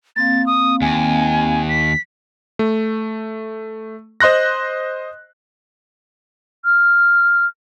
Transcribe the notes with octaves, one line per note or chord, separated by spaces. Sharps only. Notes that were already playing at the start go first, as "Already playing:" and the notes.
A#3 C4 F5 A6
D#6
D#2 G#5
B6
A3
C5 D#5 C6 F#6 A#6
F6